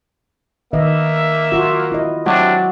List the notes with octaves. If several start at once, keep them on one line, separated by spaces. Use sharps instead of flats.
D#3 A#3 B4 D#5 E5
F4 F#4
E4 D#5
C3 F#3 D4 F6